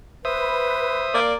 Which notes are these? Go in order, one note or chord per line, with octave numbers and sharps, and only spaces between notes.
B4 C5 E5 D#6
A#3 D5